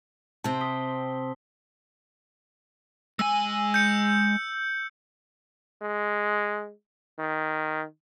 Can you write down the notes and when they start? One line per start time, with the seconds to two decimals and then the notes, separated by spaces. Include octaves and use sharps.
0.44 C3 C4 A5
0.61 D#6 B6 G7
3.19 G#3 G#5 E6
3.74 G6 C#7
5.82 G#3
7.19 D#3